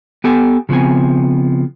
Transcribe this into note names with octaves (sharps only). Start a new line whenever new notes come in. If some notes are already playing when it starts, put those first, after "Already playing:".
B3 G4 A4 G#5
C#3 F3 B3 C4 G#5